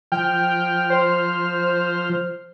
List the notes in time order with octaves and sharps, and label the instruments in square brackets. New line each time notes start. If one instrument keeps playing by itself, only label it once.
[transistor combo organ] F3 F6 [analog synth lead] G5
[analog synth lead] C5